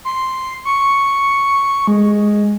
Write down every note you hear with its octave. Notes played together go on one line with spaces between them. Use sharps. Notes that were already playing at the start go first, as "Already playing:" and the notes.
C6
C#6
G#3